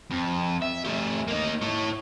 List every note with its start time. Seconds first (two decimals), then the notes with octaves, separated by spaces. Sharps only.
0.11 F2
0.62 E5
0.84 A3 G4
1.28 A#3 D#4
1.62 E4 C#5